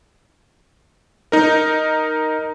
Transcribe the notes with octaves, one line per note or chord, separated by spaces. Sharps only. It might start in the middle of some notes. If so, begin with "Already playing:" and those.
D#4 A#4